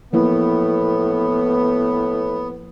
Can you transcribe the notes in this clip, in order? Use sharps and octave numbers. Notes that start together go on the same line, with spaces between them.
A2 F3 A#3 B3 E4